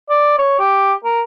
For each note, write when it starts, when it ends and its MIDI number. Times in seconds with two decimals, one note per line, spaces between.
0.10 0.37 74
0.38 0.55 73
0.59 0.93 67
1.04 1.22 70